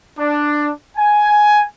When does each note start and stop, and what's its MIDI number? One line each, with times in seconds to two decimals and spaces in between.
0.18 0.69 62
0.97 1.62 80